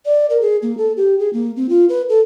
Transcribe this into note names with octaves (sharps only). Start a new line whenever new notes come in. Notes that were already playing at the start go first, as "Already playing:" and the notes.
D5
A#4
G#4
A#3
A4
G4
G#4
A#3
C4
F4
B4
A4